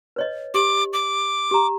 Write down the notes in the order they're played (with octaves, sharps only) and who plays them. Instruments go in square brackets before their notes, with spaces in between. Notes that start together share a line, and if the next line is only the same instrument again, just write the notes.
[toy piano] B4 C#5 D#5
[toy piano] G4 [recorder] D6
[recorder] D6
[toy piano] G4 A#5